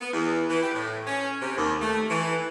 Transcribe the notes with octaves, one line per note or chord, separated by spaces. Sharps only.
B3
E2
E3
G4
A2
C#4
C3
D#2
A3
E3